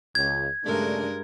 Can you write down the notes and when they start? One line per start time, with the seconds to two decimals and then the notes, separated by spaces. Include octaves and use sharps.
0.15 C#2 G#6
0.65 G2 C#3 G#3 A3 D4 A#4